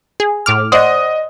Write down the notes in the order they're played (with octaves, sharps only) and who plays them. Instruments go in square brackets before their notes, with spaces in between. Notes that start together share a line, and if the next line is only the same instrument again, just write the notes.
[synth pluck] G#4
A2 D6 F6
[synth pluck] C5 D5 F#5 [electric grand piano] D#5 D#6